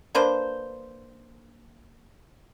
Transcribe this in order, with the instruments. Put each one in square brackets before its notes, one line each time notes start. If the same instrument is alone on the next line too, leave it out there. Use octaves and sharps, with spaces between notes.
[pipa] A#3 D4 B4 C5